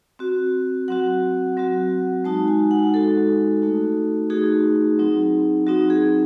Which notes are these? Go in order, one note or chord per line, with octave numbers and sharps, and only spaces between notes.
C4 F#4
F#3 C4 F#4 F#5
F#3 C4 F#4
G#3 D#4 F#4 A5
G#5
F#5
G#3 D#4 F#4 A4
A3 D#4 F#4
A3 D#4 F#4 G#4
F#3 C4 D#4
F#3 C4 D#4 F#4
G#4